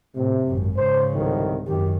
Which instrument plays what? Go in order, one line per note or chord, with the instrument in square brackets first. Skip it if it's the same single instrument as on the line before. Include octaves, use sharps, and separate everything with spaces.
[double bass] A2 [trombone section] C3
[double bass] G#1 F#2
[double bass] G#2 C#3 [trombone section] C5
[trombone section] C2 F2 D#3
[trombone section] G#1 G4 [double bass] F#2 D#3